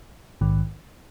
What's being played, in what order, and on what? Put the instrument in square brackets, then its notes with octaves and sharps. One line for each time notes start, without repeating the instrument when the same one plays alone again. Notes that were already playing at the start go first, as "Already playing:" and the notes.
[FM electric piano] A#1 G#2 D#3